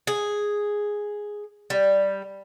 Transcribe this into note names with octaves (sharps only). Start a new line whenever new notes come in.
G#4
G3